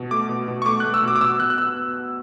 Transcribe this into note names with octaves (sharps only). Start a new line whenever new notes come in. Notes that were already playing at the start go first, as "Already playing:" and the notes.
Already playing: B2
A3 D6
B2
B2
C#6
A3 D6
A3 F#6
E6
B2 D6
D6
B2 E6
B2 F#6
F#6
B3 E6